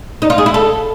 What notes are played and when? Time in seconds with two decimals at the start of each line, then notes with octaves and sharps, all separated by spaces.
0.22 D#4
0.30 F4
0.38 G#4
0.46 E4
0.54 A4